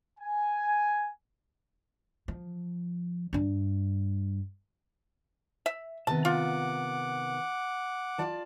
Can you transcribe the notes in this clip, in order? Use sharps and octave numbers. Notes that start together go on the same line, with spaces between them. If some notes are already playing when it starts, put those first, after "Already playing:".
G#5
F3
G2 D4
E5
C3 D#3 B3 A5
F4 F#5 D6
F4 D5 A5